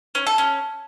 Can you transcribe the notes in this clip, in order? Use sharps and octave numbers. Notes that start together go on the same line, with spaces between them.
C#4
A4
C#4